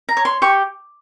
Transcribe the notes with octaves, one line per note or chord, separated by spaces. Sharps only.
A#5
C#5
C6
G4 C#6